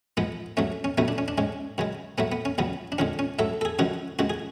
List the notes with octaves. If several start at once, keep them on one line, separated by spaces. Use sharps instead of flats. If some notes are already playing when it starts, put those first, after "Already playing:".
G#2 F3 G#3 B3
G#2 F#3 A3 C#4
C#4
C#2 B2 F#3 A3 B3
D4
C#4
D4
G#2 G#3 C#4
F#2 C#3 G#3
G#2 F#3 A3 B3
B3
C#4
C#2 C#3 F#3 B3
D4
F2 D3 G#3 C#4
C#4
G#2 F#3 A3 A4
A4
G#4
F#2 C#3 F3 G#3 F#4
C#2 C#3 G#3 F#4
G#4